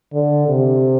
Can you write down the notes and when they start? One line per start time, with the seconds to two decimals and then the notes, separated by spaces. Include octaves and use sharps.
0.13 D3
0.48 C3